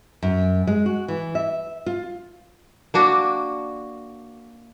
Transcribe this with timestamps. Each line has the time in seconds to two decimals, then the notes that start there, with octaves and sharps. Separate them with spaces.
0.23 F#2
0.67 G#3
0.86 F#4
1.08 E3
1.35 E5
1.86 F4
2.94 A#3 D4 F#4